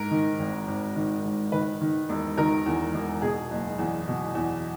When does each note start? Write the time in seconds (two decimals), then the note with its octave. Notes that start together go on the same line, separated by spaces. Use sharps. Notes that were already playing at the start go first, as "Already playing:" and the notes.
Already playing: G#2 A#4
0.11 D#3
0.39 G#1
0.67 G#1
0.96 D#3
1.24 G#2
1.52 D#3 B4
1.81 D#3
2.09 E1
2.38 D#3 A#4
2.66 E2
2.94 E1
3.22 B2 G#4
3.51 F#1
3.79 E2
4.08 B2
4.35 E2